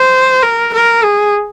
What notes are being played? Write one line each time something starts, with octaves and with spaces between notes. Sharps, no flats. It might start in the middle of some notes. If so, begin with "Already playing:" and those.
Already playing: C5
A#4
A#4
G#4